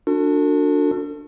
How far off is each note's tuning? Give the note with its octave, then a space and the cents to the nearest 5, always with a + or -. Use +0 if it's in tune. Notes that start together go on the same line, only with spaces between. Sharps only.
D4 +0 F#4 -35 A4 +40